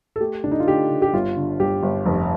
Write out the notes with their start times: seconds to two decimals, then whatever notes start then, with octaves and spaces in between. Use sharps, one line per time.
0.16 A4
0.20 A3 G4
0.44 D3 D4
0.51 D#4
0.60 F4
0.67 D3 G4
0.91 D3
1.02 G4
1.13 G1 F4
1.37 D3
1.59 G1 G4
1.83 G1
2.06 F1